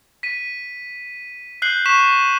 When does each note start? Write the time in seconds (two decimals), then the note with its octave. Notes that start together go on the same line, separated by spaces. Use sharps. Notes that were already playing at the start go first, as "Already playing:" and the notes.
0.23 B6 D#7
1.62 F#6 G6 C7 F#7
1.86 C#6 B6 E7